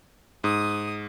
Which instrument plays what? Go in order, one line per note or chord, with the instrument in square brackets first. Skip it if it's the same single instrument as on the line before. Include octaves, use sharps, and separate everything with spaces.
[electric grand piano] G#2 [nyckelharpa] D#6